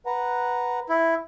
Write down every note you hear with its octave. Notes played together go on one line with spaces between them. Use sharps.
B4 F#5 A#5
E4